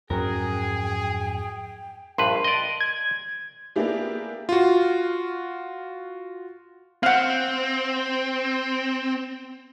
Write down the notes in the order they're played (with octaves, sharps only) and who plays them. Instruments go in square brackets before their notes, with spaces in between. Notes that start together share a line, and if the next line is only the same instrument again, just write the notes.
[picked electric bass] F2 G#2 C#4 [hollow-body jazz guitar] F#3 A#4 [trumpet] G#4 [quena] G5
[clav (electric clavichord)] A#1 G2 B4 [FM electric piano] C6
[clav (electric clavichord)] D5 D#5
[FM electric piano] G#6
[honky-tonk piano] A#3 B3 D4 E4 G4 G#4
[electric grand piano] F4 F#4
[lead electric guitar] C4 [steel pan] F5 F#5